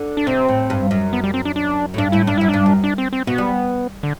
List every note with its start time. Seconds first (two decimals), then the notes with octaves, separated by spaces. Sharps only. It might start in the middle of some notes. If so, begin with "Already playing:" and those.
Already playing: D3
0.17 D4
0.27 C3 C4
0.48 A2
0.70 G2
0.91 F#2
1.13 B3
1.24 G3
1.34 C4
1.45 D4
1.56 D4
1.94 A2
1.98 G2 D4
2.12 A2 E4
2.27 G2 D4
2.38 F#2 E4
2.49 G2 D4
2.66 F#2
2.84 D4
2.98 C4
3.13 C4
3.27 B2 B3
3.38 G3
4.03 D3